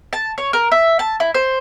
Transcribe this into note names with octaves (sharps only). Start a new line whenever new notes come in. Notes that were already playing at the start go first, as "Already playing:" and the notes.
A5
C#5
A#4
E5
A5
E4
C5